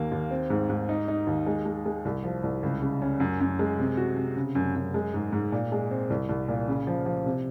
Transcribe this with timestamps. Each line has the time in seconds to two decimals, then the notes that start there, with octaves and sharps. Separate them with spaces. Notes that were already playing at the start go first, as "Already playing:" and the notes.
Already playing: D#2 A#3
0.12 D#2
0.31 C4
0.50 G#2
0.70 G#2
0.89 D#4
1.08 D#4
1.27 D#2
1.47 G#3
1.66 G#3
1.86 G#3
2.05 C2
2.24 F3
2.43 C2
2.63 C#2
2.82 C#3
3.02 C#4
3.20 F#2
3.40 F#2
3.59 G#3
3.79 C3
3.97 F#4
4.17 C3
4.37 C#3
4.55 F#2
4.76 F#2
4.94 G#3
5.14 G#2
5.32 G#2
5.52 A#2
5.72 G#3
5.91 C4
6.10 C2
6.29 C2
6.48 A#2
6.68 C#3
6.87 F3
7.06 F3
7.26 C3